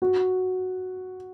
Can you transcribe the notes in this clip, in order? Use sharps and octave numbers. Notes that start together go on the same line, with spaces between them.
F#4